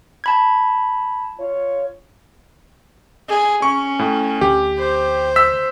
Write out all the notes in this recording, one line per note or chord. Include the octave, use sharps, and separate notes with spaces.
A5 B5 G#6
F4 C#5
G#4
C#4 C#6
A2
D2 G4
C5
E6 B6